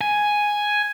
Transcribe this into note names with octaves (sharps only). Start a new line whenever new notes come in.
G#5